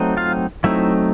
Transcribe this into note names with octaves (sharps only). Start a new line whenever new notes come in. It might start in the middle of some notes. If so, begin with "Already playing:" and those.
Already playing: F#3 A3 C4 D#4
F4 F5
F#3 A3 C4 D#4 E4 E5